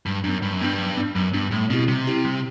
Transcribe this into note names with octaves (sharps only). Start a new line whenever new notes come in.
G2 F#3
F#2 B3 D4
G2 F#3
F#2
G2 B3 D4
F#3
B3 D4
F#2 F#3
G2 B3 D4
A2 G3
B2 C4 E4 G4
C3 G3
C4 E4 G4
G3